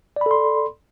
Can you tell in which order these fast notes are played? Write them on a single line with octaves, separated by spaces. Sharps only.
D5 B5 A4 C6